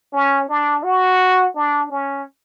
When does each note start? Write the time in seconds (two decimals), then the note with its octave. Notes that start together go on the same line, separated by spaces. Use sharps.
0.13 C#4
0.49 D4
0.84 F#4
1.55 D4
1.91 C#4